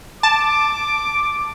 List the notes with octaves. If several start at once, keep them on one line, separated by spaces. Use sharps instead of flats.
A5 D6